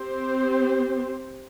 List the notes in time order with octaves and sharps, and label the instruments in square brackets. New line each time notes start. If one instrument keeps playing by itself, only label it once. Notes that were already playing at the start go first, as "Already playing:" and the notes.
Already playing: [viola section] C4 G4 C5